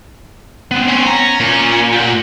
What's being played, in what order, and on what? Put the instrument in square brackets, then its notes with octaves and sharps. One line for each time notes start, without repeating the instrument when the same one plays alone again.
[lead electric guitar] B3 C4
[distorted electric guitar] C#4
[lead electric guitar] A#5
A#2
[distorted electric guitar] G4 F#5